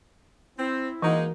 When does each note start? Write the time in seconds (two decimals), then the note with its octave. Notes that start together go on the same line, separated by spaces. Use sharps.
0.59 C4 E4
1.02 E3 G#3 A#3 D#4 F#4 A#4 D#5